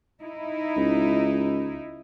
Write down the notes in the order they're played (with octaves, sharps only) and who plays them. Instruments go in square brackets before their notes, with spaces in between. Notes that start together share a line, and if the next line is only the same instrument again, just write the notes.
[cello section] D#4 E4
[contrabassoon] C#2